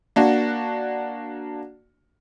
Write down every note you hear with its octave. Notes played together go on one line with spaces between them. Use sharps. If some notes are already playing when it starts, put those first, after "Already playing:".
A#3 D4 F#4